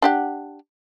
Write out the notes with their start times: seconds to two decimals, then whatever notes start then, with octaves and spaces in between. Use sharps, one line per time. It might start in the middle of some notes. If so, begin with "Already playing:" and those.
0.02 D4 G4 F#5